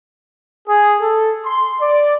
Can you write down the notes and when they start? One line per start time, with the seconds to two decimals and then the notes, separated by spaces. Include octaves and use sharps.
0.67 G#4
1.01 A4
1.45 C6
1.81 D5